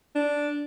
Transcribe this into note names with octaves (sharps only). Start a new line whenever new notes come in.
D4